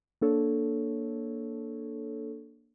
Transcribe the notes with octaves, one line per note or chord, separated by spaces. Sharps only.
A#3 D4 A4 C#5